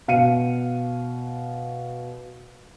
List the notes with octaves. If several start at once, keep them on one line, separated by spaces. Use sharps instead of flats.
B2 F5 C#7 D#7